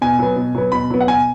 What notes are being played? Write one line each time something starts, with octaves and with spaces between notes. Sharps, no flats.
B2 G#5
F#3 B3
B2
F#3 B3
B2 B5
F#3 B3
F#5
B2 G#5